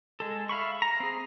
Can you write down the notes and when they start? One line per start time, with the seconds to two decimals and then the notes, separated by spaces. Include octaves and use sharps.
0.20 G#3 A4
0.49 E5 F5 B5 C#6
0.82 A#5
1.00 C4 G#4